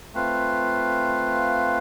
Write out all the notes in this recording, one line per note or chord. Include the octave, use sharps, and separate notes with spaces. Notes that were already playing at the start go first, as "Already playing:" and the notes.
A3 C4 F4 B4 F5